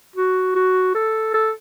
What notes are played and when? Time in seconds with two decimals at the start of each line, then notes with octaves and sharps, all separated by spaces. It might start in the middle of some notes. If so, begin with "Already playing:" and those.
0.16 F#4
0.55 F#4
0.94 A4
1.34 A4